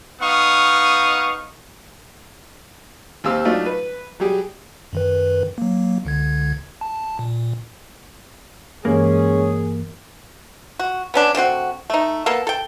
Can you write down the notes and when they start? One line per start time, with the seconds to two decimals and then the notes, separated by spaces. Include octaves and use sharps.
0.21 B3 D#4 F5 C#6 D#6
3.24 D#2 C4 G4 F5 E6
3.45 F#3 A3 D4 D#4 F4
3.66 B4
4.20 F#3 G3 G4 G#4
4.93 F#2 D#3 B4
5.58 F#3 A#3
6.05 C#2 D3 G#6
6.81 A5
7.19 A#2
8.85 G2 E3 G#3 A#3 C#4 G#4
10.79 F#4
11.14 B3 C#4 D4
11.35 D3 A3 C4 F#4
11.90 A3 D#4
12.26 A#3 B3 A4
12.47 A4 G5